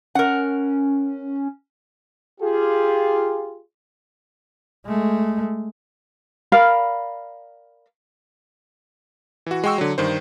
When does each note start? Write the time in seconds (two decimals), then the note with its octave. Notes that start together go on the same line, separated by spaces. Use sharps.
0.15 C#4 A#4 F#5
2.41 F4 G4 G#4
4.86 G#3 A3
6.52 A#4 D5 F5 B5
9.46 E3 F#4
9.64 G#3 F#4 G5 C#6 E6
9.78 D3 F#3
9.98 G2 D#3 C5